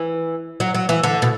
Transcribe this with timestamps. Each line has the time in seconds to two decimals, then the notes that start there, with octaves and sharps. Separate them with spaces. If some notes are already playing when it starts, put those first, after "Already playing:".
Already playing: E3
0.60 F#3
0.75 F#3
0.89 E3
1.03 D3
1.22 B2